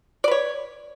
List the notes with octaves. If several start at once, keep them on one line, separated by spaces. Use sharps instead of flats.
B4 C#5 D5